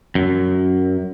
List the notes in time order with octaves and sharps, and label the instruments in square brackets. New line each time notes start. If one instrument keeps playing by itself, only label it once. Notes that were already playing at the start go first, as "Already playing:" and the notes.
[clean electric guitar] F#2